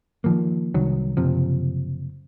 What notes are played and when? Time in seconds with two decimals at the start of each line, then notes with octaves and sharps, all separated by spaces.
0.24 D#3 F3 A#3
0.74 C2 D#3 F#3
1.17 F#1 C3 F3